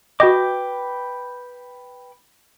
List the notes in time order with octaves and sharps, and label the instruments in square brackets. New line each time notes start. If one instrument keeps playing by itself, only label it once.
[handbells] F#4 D#5 [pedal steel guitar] B4 G5 D6